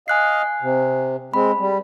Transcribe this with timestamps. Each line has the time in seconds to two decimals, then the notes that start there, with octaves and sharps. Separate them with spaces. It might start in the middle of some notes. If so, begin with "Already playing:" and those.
0.08 D#5 F5 G#5 F#6 C7
0.62 C3
1.34 G#3 C4 B5
1.59 G3